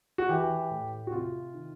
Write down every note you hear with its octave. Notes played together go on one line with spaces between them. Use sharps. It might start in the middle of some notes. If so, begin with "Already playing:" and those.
F#4
E3 G4
A2
F#4
C3 F4
D#3